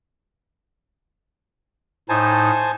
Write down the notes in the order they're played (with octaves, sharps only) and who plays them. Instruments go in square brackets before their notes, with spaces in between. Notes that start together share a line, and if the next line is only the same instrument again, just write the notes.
[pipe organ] A2 D#4 [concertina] C5 G#5 A5